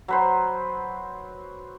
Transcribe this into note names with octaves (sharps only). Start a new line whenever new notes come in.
F#3 B4 C5